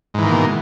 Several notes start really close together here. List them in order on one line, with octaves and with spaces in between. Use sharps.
G#2 E3 D#3 A#3 B2